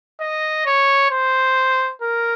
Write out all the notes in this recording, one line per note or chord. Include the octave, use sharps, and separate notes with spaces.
D#5
C#5
C5
A#4